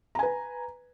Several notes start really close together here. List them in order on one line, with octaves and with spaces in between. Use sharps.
A#5 G#5 B4